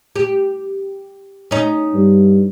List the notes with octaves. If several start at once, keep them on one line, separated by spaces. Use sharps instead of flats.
G4
C#4 D#4
G2